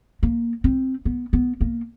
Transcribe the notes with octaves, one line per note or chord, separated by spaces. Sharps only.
A#3
C4
B3
B3
A#3